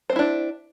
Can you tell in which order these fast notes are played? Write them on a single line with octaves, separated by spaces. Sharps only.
C5 C4 E4 D4